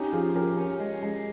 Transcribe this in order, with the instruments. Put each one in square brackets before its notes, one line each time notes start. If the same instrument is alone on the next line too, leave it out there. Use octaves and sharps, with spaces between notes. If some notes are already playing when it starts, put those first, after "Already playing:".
Already playing: [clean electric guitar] C#4 [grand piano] D#4 G4
[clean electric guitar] F3 [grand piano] F4 G#4
[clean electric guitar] C#4 [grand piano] G4 A#4
[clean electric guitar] C#4
G#3
G#3